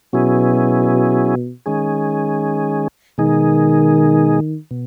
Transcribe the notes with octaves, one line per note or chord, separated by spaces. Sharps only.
B2 F#3 C#4 E4 G#4
D#3 G#3 C#4 G#4
B2 D#3 G#3 D#4 G#4
B2